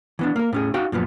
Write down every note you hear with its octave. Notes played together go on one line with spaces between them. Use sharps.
E3 B3 D4
A#3 A#4
A2 C#4 G#4
D#4 F#4 F5 G5
F#2 A#2 F3 B3